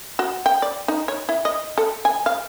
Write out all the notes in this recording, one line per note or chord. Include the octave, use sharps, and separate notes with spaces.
F#4
G5
D5
D#4
C#5
E4
D#5
A4
G#5
F5